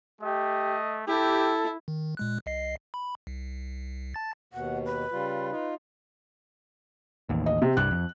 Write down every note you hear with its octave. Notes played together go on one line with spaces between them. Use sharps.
A3 G4 D#5
E4 G4 A4
D#3
A#2 G#3 F#6
C2 D#5 C7
B5
C2
A5 A6
D#2 B2 F#5
B4
C#3 G3 F4
D#4 F4
A1 D#2
D#5
C3
C2 G2 F#6
F2